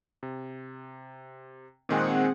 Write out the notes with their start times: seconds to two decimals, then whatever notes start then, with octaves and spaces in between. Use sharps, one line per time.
0.23 C3
1.89 A#2 D#3 G#3 C4 G#4 F#5